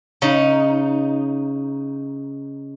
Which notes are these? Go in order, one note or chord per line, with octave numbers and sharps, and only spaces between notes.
C#3 D#4